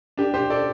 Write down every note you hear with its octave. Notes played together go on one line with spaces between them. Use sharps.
D4 G4
G4 C5
A4 D5